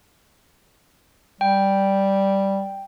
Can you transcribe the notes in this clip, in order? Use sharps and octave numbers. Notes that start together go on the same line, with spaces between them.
G3 G5